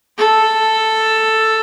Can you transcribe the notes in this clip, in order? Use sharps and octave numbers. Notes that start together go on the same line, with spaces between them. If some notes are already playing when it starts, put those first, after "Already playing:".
A4